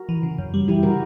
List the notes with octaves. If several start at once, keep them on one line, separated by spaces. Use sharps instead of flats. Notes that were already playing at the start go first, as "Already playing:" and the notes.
Already playing: F#4 A#4
E3
C#3
F#2
G3
E3 E4 G4
C#3 F#4 A#4